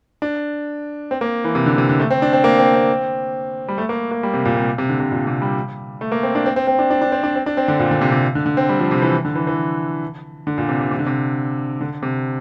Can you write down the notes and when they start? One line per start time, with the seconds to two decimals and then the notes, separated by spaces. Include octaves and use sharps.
0.22 D4
1.11 C4
1.21 A#3
1.44 E3
1.55 C3
1.66 D3
1.78 C3
1.89 D3
2.00 A3
2.10 C4
2.22 D4
2.33 C4
2.44 A#3
2.59 C4
2.74 C4
3.68 G3
3.78 A3
3.89 A#3
4.11 A#3
4.23 G3
4.34 C3
4.45 A#2
4.56 C3
4.78 C3
4.89 D3
5.00 C3
5.12 A#2
5.27 C3
5.42 G3
6.01 A3
6.12 A#3
6.23 C4
6.35 D4
6.46 C4
6.56 C4
6.67 C4
6.79 D4
6.90 D4
7.01 D4
7.12 C4
7.23 D4
7.35 C4
7.46 D4
7.57 C4
7.68 D3
7.79 A#2
7.91 D3
8.01 C3
8.12 C3
8.35 D3
8.46 D3
8.57 C4
8.69 G3
8.79 F3
8.91 C3
9.02 E3
9.25 D3
9.35 E3
9.47 E3
10.47 D3
10.58 A#2
10.69 C3
10.81 C3
10.91 C3
10.99 D3
11.07 C3
11.81 D3
12.03 C3